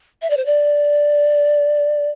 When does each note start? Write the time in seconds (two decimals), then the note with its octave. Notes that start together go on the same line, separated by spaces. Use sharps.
0.22 E5
0.30 D5
0.37 C5
0.46 D5